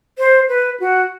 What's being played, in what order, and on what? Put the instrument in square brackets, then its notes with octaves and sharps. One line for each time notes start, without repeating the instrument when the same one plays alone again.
[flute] C5
B4
F#4